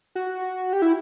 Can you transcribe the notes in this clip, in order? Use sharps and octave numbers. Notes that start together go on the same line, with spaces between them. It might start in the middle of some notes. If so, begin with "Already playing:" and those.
F#4
G4
E4